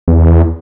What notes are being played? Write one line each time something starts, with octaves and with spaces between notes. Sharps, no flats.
E2